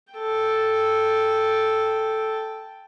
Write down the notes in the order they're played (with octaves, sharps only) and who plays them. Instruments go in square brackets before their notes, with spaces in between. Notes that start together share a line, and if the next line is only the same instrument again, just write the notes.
[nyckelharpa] A4 G5